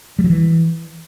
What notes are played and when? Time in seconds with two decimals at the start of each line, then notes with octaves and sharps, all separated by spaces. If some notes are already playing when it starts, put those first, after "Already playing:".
0.19 G3
0.24 F#3
0.30 E3